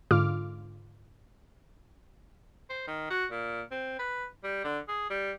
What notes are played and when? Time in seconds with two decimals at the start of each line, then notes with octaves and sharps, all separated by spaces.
0.11 G#2 D3 F4 D6 F6
2.70 C5
2.87 D#3
3.10 F#4
3.31 A#2
3.71 C4
3.99 B4
4.44 G3
4.64 D3
4.88 G#4
5.10 G3